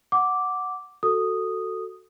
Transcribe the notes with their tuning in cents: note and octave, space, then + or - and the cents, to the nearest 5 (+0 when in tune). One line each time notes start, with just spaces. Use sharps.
F#5 +0 D6 -5
F#4 +0 A4 +15 D#6 -5